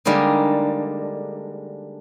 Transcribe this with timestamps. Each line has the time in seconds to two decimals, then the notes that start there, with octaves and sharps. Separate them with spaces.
0.05 D3 G3 G#3 A#3 D#4